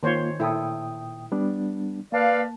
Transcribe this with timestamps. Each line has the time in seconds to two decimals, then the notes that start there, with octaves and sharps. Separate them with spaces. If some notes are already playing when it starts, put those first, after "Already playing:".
0.03 D#3 A#3 F4 C5 C#5
0.40 A#2 E4 A4 G5 D#6
1.32 G3 B3 D4
2.12 A#3 B4 D5 F5 A5